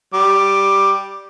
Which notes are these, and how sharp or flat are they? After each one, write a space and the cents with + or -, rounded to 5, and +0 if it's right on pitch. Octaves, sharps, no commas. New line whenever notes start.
G3 +0 D6 +10